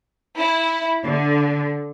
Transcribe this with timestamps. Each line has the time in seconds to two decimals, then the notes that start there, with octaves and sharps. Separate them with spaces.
0.37 E4
1.02 D3